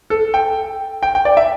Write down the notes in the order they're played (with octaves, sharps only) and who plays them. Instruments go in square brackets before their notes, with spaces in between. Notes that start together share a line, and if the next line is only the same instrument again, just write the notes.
[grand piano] A4
G5
G5
G5
D5
E5